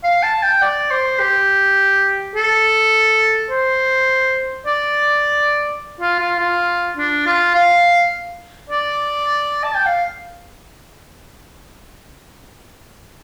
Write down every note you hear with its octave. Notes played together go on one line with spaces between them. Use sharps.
F5
A5
G5
D5
C5
G4
A4
C5
D5
F4
F4
F4
D4
F4
F5
D5
A5
G5
F5